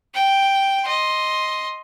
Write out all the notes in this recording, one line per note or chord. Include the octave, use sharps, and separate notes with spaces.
G5
D#5 C6